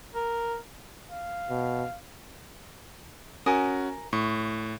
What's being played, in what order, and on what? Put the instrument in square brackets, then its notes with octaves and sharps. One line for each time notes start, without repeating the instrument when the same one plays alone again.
[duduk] A#4
[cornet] F5
[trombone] B2
[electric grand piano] C#4 F#4 [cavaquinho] A#4 G#5 D#6
[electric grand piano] A2 [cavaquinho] C#6